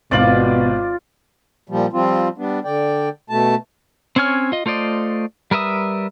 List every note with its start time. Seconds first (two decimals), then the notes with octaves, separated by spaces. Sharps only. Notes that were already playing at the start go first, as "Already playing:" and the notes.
0.11 G#1 B2 F4 D5 F#7
1.69 A#2 F3 G3
1.93 F3 G3 C4 F4
2.38 G3 B3 D4
2.64 D3 D5 G5
3.30 B2 A3 A5
4.16 C4 C#4 C#5 G#5 F6
4.52 F4 D#5
4.66 A3 F4 C5 D5 D#5
5.51 G3 A#4 B4 E5 D#6